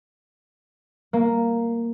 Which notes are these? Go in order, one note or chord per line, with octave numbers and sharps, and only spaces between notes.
A#3